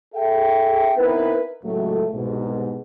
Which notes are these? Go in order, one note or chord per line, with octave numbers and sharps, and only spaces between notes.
G#4 A4 E5 G5
B3 C4 D#4 E4 A#4 B4
C#2 A2 F#3 A3
C2 G#2 B2